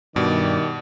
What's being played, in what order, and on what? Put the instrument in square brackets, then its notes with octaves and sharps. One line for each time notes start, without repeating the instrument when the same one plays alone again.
[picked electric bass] G2 [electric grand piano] B2 [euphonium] D#3 [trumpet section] E4 G4 D5